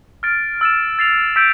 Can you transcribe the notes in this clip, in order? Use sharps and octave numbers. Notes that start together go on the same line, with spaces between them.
F6 A6 D7
E6 A6 E7
A6 C7 F7
E6 G6 B6 D7